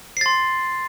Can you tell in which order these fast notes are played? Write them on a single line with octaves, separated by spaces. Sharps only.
C7 A6 C6